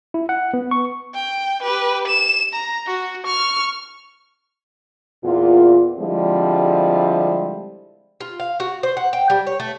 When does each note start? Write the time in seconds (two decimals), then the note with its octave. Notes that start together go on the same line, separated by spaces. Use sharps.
0.14 E4
0.29 F#5
0.54 B3
0.71 C#6
1.15 G5
1.63 G4 B4
2.08 E7
2.54 A#5
2.87 F#4
3.27 C#6 F6
5.24 E2 A#2 F4
5.98 D3 F3 G3 G#3 C4 E4
8.21 F4
8.40 F5
8.60 F#4
8.83 C5
8.97 F#5
9.13 G5
9.30 G3
9.47 C#5
9.60 A3